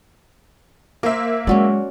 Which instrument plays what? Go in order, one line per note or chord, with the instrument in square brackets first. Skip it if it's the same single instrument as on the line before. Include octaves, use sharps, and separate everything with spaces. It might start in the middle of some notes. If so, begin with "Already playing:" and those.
[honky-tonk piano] A#3 E5 [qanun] A#4 C5
[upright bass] F#3 G#3 [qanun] C#4 F#4 D5